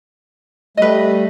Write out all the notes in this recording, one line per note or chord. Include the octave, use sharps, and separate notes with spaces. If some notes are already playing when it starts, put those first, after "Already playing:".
G3 A3 B4 D#5